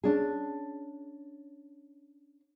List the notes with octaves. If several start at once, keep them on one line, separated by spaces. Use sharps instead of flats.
C#4 D4 G#4